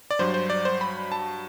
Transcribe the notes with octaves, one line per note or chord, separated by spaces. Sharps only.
D5
G2 F#3 C5
C5
D5
C5
B5
A5